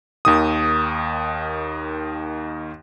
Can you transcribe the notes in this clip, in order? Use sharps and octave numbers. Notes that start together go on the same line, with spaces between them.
D#2 D#3 D#6